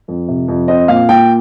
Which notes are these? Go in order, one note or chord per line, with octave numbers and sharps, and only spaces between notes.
F2
C3
F2
C4 D#5
A#2 F5
A#2 G5